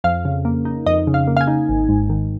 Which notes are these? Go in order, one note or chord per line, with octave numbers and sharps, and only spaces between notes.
F2 F5
C#3
A#3
D#4
F2 D#5
C#3
F5
A#3
F5
G#5
D#4
G#1
G#2
D#3